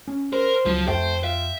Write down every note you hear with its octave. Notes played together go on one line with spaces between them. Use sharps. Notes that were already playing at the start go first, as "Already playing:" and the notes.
C#4
A#4 C5
C#2 F3 F#3 F4
F2 A3 C5 G5
F4 E5